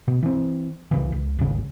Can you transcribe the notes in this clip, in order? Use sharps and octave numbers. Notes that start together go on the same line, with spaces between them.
B2
E3 C4
C2 C#3 E3
C#2
D#1 G#1 C#3 C#4